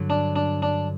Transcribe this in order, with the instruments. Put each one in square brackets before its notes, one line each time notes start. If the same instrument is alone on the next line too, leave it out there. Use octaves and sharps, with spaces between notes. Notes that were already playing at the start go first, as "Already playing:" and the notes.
Already playing: [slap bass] G2 D3 F#3
[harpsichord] D4
D4
D4